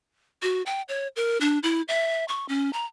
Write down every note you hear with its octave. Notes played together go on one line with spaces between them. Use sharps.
F#4
G5
C#5
A#4
D4
E4
E5
C#6
C#4
A#5